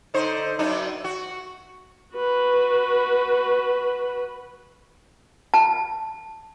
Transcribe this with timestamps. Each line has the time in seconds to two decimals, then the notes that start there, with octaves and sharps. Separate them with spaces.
0.14 D3 D#4 C5
0.59 F#2 D4 D#4
1.04 F#4
2.15 F#4 B4
5.54 A5